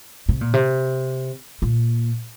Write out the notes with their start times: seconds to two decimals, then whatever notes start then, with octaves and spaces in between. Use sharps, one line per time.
0.29 C3
0.41 A#2
0.54 C3
1.62 A#2